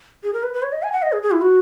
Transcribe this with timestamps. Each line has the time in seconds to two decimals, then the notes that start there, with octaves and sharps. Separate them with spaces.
0.23 G#4
0.33 A#4
0.43 B4
0.53 B4
0.63 C#5
0.72 D#5
0.83 G#5
0.92 F#5
1.02 D#5
1.12 G#4
1.22 G#4
1.31 E4
1.42 F#4